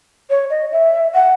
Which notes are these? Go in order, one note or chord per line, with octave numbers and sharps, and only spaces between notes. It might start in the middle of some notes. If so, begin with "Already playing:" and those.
C#5
D#5
E5
F#5